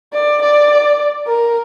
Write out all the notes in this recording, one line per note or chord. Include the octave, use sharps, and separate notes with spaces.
D5
D5
A#4